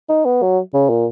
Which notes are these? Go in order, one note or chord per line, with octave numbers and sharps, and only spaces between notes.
D#4
B3
F#3
C#3
A#2